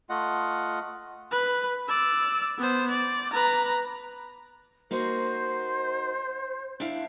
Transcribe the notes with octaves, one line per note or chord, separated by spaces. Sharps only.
A3 F4 D#5 F#5
B4
D5 E6
B3 C5
D5
B4 A#5
A#3 D#4 F#4 C5
D4 E4 F5